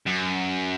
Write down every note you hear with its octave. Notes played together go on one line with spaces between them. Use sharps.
F#2